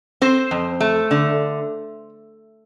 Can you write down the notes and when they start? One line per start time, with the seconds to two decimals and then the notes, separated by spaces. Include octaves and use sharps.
0.21 C4 C5
0.51 F2
0.80 A3
1.11 D3